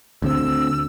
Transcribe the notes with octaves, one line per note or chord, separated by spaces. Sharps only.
D2 D3 C4 E6